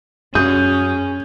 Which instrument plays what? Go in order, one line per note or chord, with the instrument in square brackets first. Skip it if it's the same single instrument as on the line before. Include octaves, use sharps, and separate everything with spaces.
[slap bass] F#2 [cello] C#4 [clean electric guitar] G#4 [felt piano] G6